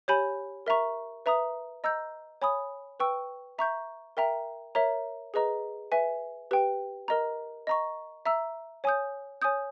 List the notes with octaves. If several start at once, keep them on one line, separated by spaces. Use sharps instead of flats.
G4 C#5 G#5 B5 G6
A#4 E5 A#5 C#6
B4 E5 A#5 D#6
D#5 A#5 E6 G6
C#5 G#5 B5 D#6
B4 G5 C#6 E6
E5 A#5 C#6 G6
A#4 E5 G5 A#5
A#4 C#5 E5 A#5
G#4 B4 D#5 A#5
B4 E5 G#5
G4 B4 G5
A#4 D#5 A#5
D#5 A#5 C#6
E5 A#5 E6
C#5 G#5 D#6 G6
C#5 G#5 D#6 G6